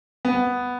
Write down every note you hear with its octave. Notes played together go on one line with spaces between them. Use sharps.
B3